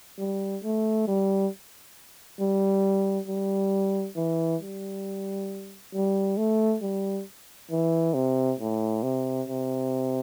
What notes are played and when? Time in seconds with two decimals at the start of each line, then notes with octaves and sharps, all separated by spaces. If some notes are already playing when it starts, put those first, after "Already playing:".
0.18 G3
0.63 A3
1.08 G3
2.40 G3
3.28 G3
4.16 E3
4.61 G3
5.94 G3
6.37 A3
6.82 G3
7.71 E3
8.14 C3
8.59 A2
9.03 C3
9.48 C3